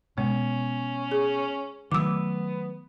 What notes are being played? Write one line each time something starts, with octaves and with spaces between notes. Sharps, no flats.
B2 G#3 C#4
G#4
D#3 F#3 A3 B3 D6 E6